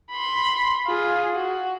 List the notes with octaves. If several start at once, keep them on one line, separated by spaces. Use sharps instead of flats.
B5 C6
F4 G#4
F#4